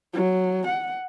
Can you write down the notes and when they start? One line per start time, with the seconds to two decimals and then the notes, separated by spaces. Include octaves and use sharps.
0.14 F#3
0.67 F#5